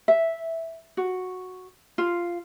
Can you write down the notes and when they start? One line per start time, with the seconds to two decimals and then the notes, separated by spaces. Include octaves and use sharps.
0.08 E5
0.97 F#4
1.98 F4